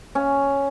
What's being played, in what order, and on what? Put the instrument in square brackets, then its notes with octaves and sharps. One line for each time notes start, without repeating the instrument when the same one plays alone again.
[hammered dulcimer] C#4